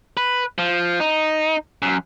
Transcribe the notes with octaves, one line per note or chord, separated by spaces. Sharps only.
B4
F3
D#4
F#2